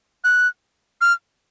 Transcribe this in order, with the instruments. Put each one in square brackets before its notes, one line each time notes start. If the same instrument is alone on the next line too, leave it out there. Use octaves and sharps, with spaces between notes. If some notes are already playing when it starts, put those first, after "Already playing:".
[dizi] F#6
F6